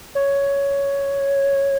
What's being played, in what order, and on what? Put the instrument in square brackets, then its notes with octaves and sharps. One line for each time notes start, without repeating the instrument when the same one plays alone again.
[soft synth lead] C#5